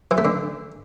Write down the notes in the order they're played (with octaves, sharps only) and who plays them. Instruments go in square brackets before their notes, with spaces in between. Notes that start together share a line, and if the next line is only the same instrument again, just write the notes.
[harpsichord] E3
A3
D3